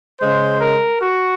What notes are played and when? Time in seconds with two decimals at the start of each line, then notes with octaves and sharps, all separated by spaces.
0.20 C#3 G#3 C5
0.60 A#4
1.01 F#4